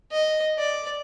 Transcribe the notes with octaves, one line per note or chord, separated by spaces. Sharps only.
D#5
D5